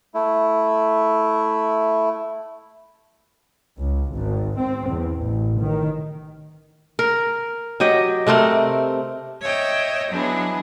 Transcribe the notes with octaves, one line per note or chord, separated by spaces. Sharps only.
A3 E4
C#2
G#1
C4
E2
A1
D#3
A#4
F#3 G4 D#5 G5
C3 A3 C4 A#4
C#5 D#5 E5 G5
F#3 G#3 B3 D4 E4